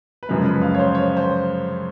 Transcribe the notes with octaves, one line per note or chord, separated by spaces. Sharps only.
B4
F#2 C#3 F3 G#3 A#4
B4
F5
C#5
C5
C#5
C5